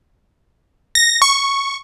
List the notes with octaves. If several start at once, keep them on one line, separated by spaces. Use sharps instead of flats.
A#6
C#6